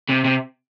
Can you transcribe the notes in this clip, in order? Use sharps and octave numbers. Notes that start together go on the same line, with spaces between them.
C3
C3